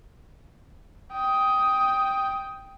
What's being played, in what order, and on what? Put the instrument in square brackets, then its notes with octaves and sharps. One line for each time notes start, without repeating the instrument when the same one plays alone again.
[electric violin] G5 D#6